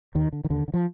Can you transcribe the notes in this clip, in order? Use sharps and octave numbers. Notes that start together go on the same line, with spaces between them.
D#2 D#3
D3
D#3
D#2 D3
D3
F3